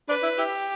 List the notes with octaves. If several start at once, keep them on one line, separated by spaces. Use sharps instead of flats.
D4 B4
E4
E4 G4